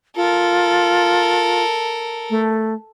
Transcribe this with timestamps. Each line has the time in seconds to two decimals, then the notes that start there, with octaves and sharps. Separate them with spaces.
0.16 F4 A4 A#4
2.30 A3